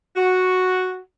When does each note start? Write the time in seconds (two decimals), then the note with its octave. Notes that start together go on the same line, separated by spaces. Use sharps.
0.16 F#4